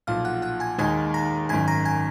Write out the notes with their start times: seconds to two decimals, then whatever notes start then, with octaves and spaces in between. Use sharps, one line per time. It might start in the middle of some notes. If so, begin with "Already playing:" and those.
0.07 B1 A#2 F3 F5 F6
0.25 F#5 F#6
0.42 F#5 F#6
0.60 G#5 G#6
0.78 D#2 D#3 G#3 D#4 G#5 G#6
1.14 A#5 A#6
1.49 G#1 F#2 D#3 G#5 G#6
1.68 A#5 A#6
1.85 G#5 G#6